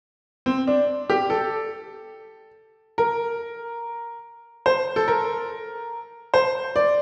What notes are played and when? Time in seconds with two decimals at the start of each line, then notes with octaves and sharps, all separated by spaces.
0.46 C4
0.67 D4
1.10 G4
1.30 A4
2.98 A#4
4.66 C5
4.96 A4
5.08 A#4
6.34 C5
6.76 D5